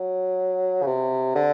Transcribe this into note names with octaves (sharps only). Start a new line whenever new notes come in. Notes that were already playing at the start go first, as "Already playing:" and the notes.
Already playing: F#3
C#3
C3
D3